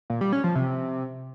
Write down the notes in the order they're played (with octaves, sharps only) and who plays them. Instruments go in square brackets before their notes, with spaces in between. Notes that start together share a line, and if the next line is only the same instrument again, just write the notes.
[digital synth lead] A#2
G3
C#4
F3
C3